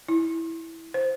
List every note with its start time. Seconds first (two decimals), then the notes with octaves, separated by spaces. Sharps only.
0.08 E4
0.94 C5